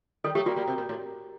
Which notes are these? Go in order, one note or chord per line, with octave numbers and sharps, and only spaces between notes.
D#3 G3 A4
F#3 A3 G4
G3 A#3 F#4
G3 A#3
C3
A#2
A2